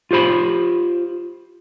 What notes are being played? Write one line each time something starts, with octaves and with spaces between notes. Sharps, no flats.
F4 G4 C5 B5